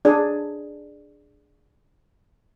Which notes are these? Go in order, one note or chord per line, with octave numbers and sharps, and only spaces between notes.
D4 G#4 D5